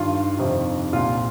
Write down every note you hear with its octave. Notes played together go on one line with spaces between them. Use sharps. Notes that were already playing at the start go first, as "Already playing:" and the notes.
Already playing: G2 D#3 F4
F2 C3 D#3
C2 A#2 F4